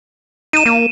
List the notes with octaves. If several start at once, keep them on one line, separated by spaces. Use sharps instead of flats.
D#4 D#7 E7
A#3